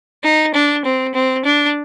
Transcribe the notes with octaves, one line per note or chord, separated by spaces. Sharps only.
D#4
D4
C4
C4
D4